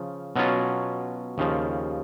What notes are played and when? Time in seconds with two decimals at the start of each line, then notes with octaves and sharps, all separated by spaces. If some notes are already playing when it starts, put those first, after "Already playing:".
Already playing: C#3 F3
0.36 B2 F#3 C#4 F4
1.38 D#2 C#3 F3